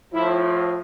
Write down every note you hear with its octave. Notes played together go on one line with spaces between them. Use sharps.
A2 F3 E4